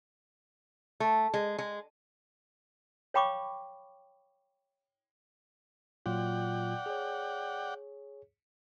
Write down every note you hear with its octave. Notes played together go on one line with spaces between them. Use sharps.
A3
G#3
G#3
C#5 F5 G5 B5 C#6 D6
A#2 F#3 F4 D5 F#5 G5
G#4 C#5